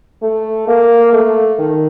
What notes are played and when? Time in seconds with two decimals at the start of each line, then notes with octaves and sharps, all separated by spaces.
0.22 A3
0.68 A#3
1.13 A3
1.59 D#3